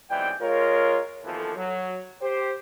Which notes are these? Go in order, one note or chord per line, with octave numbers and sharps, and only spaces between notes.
B1 C3 E3 G#3 D5 G5
G#3 F4 A#4 C#5
D#2 B2 E3 F3 A4
F#3
G4 C5